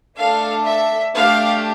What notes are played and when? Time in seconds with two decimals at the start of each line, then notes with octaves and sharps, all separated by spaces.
0.18 A3 D4 A4 F5
0.66 E5
1.14 A3 D4 G4 F5